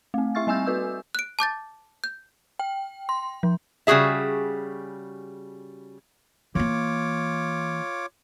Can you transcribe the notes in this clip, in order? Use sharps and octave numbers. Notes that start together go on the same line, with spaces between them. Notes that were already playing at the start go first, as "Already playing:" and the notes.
A3 C4
E4 E5 C#6 F6 A6
G3 C4 E5 G#5 E6 G6
F#4 B4 E6
F#6 D7
A5 D6 G6 A6
G6
G5
C6
F3
C#3 G3 F#4 G#4 E5
E3 A#3 F4 C#5 D6